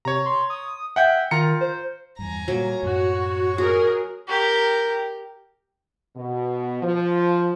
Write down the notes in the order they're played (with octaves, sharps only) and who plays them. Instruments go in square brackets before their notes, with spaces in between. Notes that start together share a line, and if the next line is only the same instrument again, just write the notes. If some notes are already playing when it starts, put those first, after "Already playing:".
[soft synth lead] C3 [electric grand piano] C#5 A#5
[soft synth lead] C6
D#6
[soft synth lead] E5 [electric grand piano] F#5 G5 G6
[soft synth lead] D#3 [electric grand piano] F4 A#5 C#7
[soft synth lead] C5
[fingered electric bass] E2 G2 [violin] G#5 A#5
[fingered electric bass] A#2 G3 [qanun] F#3 A#3
[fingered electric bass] F#2 A2 [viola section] F#4 [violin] C#5
[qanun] F#4 [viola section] G#4 A#4
[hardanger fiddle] G4 A#4
[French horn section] B2
F3